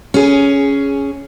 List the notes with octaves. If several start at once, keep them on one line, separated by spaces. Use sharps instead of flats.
C#4 G#4